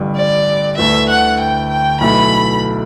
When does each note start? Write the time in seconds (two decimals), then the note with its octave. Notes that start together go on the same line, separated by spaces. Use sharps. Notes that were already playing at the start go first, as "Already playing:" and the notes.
Already playing: A1 G2 D3 G3
0.16 D5
0.77 D2 D3 A3 E4 B4 E5
1.09 F#5
1.40 G5
1.71 G5
2.01 B1 B2 A3 E4 A4 B5